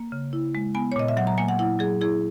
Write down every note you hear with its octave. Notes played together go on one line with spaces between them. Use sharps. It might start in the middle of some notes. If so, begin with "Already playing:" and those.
Already playing: A#3
C#3
E4
G#3
B3 G#5
C#5
A#2 D#5
E5
F#3 F#5
A#5
A#3 G#5
F#5
E4 F#5
F#3 G#4
E4 G#4